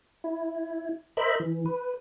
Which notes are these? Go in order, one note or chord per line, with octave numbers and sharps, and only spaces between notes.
E4
A#4 C5 D#5 E5 B5
E3
B4